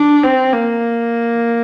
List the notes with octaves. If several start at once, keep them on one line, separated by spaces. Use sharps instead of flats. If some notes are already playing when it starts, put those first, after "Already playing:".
Already playing: D4
C4
A#3